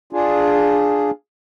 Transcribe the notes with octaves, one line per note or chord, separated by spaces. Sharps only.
D4 F4 G#4